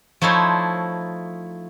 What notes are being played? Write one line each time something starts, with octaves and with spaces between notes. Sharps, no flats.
F3 A3 D#4 E4 C5 C#5